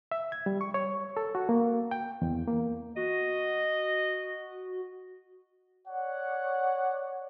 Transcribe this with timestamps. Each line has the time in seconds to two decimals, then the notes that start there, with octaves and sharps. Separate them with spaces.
0.12 E5
0.32 G#6
0.46 G3
0.61 C#6
0.74 C#5
1.17 A4
1.35 F#4
1.49 A#3
1.91 G5
2.22 E2
2.48 A#3
2.96 F#4 D#5
5.88 C#5 D5 F#5